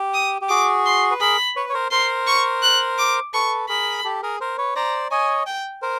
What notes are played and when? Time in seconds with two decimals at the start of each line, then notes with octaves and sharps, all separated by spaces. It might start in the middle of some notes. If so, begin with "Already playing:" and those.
Already playing: G4
0.14 D#6
0.42 G4
0.49 F#4 G#4 D6
0.86 C6
1.11 B4
1.21 G#4 A#4 B5
1.56 B4 C#5
1.69 C#5
1.74 A#4 C5
1.91 A#4 C5 C6
2.27 C#6
2.63 F#6
2.98 D6
3.34 A4 B4 C#6
3.69 G#4 A#4 B5
4.04 G4 A4
4.23 G#4 A#4
4.41 A#4 C5
4.58 B4 C#5
4.76 C5 D5 A#5
5.11 C#5 D#5 G#5
5.47 G5
5.82 A#4 C5